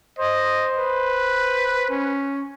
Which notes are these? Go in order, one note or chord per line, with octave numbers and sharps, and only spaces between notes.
C5 D#5
B4
C#4